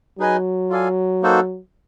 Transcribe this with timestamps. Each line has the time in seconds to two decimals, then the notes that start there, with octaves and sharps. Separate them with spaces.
0.19 F#3 D#4 G#4 B4 D#5 G#5
0.70 F4 A4 D5 F5 G#5
1.22 A#3 D#4 F#4 A4 C5